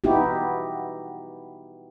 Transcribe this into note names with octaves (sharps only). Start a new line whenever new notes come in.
B3 D#4 E4 F#4 G4